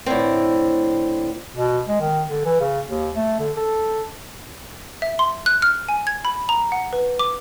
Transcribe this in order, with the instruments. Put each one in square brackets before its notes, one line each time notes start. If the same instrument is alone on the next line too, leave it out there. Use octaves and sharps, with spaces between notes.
[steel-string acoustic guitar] A2 D3 C4
[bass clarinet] B2
G#3
D#3
D3
E3
C#3
D#2
A3
D3
A4
[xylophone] E5
C6
F#6
F6
G#5
G#6
B5
A#5
F#5
B4
D6